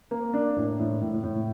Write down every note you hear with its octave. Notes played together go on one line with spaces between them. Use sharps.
A#3
D4
A2
A2
A2
A2